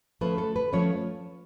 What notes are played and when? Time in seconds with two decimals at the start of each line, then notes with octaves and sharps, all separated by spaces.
0.21 F3 A3 C#4 B4
0.38 A4
0.56 B4
0.72 F3 A3 C#4 C#5